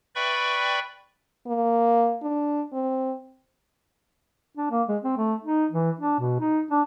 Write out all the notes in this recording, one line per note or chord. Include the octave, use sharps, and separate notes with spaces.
B4 D5 E5 G5 B5 C#6
A#3
D4
C4
D4
A#3
G#3
C4
A3
D#4
E3
D4
B2
D#4
D4